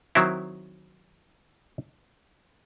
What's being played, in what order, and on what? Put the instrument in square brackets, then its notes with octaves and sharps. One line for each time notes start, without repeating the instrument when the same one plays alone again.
[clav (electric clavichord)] D#3 F#3 C4 E4